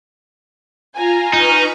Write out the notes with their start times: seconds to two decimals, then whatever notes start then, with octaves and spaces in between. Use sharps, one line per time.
0.95 F4 G#5 A#5
1.33 D#4 B4 C#6 F6